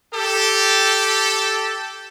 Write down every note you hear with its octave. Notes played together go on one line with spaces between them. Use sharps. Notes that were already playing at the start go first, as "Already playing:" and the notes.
G4 A4